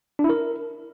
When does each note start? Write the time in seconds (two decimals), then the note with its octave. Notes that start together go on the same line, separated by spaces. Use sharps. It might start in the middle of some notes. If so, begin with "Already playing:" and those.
0.19 D4
0.24 E4
0.29 A#4